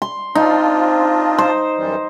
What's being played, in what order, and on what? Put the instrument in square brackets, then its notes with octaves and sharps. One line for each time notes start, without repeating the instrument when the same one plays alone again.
[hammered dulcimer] C6
[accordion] C4 D4 F4 [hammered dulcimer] D#4
[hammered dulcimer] C5
[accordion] F#2 E3 G3